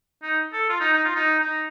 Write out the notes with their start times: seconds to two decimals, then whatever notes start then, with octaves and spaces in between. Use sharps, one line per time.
0.23 D#4
0.53 A4
0.70 F4
0.80 D#4
0.93 D#4
1.05 F4
1.15 D#4
1.40 D#4